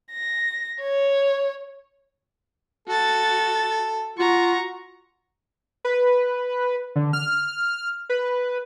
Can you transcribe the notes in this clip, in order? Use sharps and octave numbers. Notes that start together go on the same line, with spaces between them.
A#6
C#5
F#4 A4 A6
F4 F#4 A#5 C#6
B4
D3
F6
B4